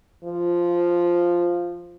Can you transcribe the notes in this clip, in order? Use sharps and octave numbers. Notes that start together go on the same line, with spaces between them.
F3